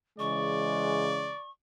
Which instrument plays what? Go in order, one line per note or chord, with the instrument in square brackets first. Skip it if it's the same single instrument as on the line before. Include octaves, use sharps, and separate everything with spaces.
[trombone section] C#3 E3 G#3 [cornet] D5 [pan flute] C#6